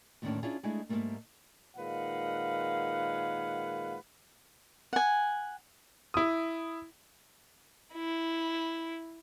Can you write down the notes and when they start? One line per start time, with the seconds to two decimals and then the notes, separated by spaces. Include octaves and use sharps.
0.22 D#2 A2 D3 D#3 C#4 D4
0.43 C#4 D4 E4 F4 G#4
0.63 G#3 A3 D4 E4 G#4
0.89 G#2 D#3 G3 A3 A#3
1.77 A#2 D#3 G#3 B4 F5 F#5
4.93 F#5 G#5
6.14 E4 D#6
7.94 E4